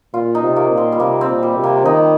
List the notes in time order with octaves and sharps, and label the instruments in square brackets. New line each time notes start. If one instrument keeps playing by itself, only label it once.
[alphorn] A#2 [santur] F4
[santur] D#4
[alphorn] C3
[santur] A#3
[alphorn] A#2
[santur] C4
G3
[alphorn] C3 [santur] A#3
[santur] C4
[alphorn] A#2
[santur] G3
[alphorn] C3
[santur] A#3
[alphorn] D#3 [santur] D#4